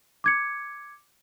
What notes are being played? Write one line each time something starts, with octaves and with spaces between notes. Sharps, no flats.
D6 G#6 C#7